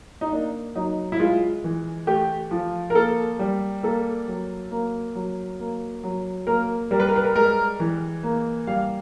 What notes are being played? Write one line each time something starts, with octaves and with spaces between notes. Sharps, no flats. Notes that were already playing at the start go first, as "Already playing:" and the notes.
D#4
A#3 D4
F#3 D#4
E4
G#3 F4
E3
A3 G4
F3
A#4
A#3 A4
G3
A#3 A4
F#3
A#3
F#3
A#3
F#3
A#3 A#4
G3 A#4
B4
A#4
B4
A#4
G#3 A#4
E3
A#3
G3 F5